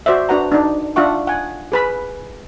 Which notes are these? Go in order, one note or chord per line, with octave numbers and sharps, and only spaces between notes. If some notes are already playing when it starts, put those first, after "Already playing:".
F#4 C5 D5 E5
D4 F#4 B4 F#5 A#5
D4 D#4
D4 F4 E5 F#5 C#6
F#5 G#5
G#4 B4 B5